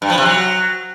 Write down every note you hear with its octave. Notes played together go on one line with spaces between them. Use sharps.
G2
F3
C3
F#3